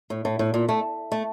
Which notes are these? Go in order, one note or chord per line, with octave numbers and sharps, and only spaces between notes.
A2
A2
A2
A#2
A3
A3